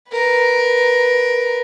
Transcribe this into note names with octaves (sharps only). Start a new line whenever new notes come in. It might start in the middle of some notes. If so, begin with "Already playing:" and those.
A#4 B4